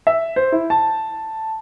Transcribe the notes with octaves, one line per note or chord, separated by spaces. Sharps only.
E5
C5
E4
A5